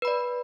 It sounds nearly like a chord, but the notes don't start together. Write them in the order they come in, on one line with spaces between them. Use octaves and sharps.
B4 B5 D5